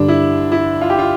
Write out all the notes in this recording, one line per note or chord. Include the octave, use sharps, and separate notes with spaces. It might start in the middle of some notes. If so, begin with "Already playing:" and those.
Already playing: G2 D3 G3 D4
E4
E4
F4
G4
F4